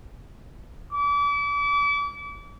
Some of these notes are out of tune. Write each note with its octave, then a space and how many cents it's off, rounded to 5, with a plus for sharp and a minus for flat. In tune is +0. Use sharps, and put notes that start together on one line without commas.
D6 -35